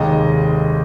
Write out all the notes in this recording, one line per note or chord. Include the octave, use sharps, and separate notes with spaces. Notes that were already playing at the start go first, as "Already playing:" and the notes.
Already playing: F1 D#2 D#3 G#3 D#5